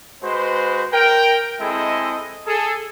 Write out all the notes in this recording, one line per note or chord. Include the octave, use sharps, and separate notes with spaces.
G#3 F#4 B4 C5
A#4 G5
G#3 C4 E4 G#4 A4 D#5
G#4 A4